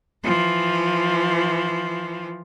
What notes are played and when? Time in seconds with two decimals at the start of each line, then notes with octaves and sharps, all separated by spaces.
0.24 E3 F3